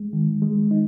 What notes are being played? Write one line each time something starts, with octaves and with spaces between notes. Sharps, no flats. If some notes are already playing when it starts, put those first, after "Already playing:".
Already playing: G#3
D#3
G#3
D#4